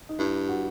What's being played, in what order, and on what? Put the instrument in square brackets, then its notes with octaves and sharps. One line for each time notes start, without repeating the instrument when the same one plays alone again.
[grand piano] D#4
[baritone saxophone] G2 [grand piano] E4
[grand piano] F#4